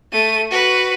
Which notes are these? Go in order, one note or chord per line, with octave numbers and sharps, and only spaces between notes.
A3 D#7
F#4 B4